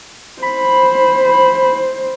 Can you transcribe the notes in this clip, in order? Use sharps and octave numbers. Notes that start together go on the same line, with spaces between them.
C5 B5